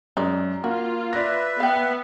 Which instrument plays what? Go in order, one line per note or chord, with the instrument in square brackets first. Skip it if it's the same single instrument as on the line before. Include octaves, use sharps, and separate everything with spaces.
[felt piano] F#2 [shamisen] G#3 D#4 D5
[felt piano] A#3 [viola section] F4 [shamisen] F#4
[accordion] B4 E5 [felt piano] D5 A#6
[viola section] B3 [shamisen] F5 G5